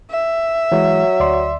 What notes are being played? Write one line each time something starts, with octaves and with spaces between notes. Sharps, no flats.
E5
E3 F#3 G#3
D2 D5 C6